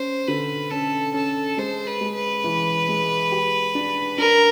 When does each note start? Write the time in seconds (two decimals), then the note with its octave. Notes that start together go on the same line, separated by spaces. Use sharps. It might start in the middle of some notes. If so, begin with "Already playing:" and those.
Already playing: C#4 C5
0.27 D3 B4
0.71 C#4 A4
1.14 C#4 A4
1.57 G#3 C5
1.87 B4
2.01 G#3
2.15 B4
2.44 E3
2.88 G#3
3.32 G4
3.75 D4
4.18 D4 A#4